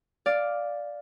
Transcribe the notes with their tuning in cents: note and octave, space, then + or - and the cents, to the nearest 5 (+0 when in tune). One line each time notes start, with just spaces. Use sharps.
D5 +0 F5 +5